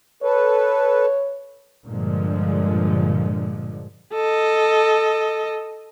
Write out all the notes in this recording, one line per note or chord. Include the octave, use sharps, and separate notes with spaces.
A4 B4 C#5
G2 A#2 D3 F3 G#3
A4 D#5